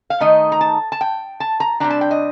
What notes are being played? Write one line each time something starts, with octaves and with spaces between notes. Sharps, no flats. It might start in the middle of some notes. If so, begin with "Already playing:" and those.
F5
D#3 A3 D#4 D#5
A#5
A5
A5
G5
A5
A#5
C3 G3 D4 A#5
A5
G5
D#5